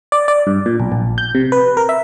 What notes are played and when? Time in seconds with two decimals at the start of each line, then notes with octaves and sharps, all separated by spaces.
0.12 D5
0.28 D5
0.47 G2
0.66 A#2
0.80 B1
0.92 A#1
1.18 G6
1.35 C3
1.52 B4
1.77 A#4
1.89 E5